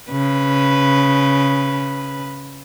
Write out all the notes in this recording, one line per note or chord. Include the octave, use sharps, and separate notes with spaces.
C#3 B4